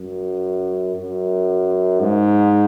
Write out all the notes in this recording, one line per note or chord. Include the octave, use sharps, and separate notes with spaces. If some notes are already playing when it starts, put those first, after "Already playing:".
Already playing: F#2
F#2
G#2